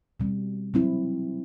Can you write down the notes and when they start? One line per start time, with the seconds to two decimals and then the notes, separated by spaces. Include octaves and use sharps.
0.20 B2 G3 C4
0.74 F#3 C4 E4